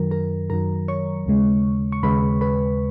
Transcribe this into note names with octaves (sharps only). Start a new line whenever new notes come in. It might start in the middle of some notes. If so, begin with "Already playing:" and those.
Already playing: F#2 D#3 F#3 A#4 A#5
A#4 A#5
F#2 D#3 F#3 A#4 A#5
C#5 C#6
D#2 C#3 G#3
C#6
D#2 C#3 G#3 B4 B5
B4 B5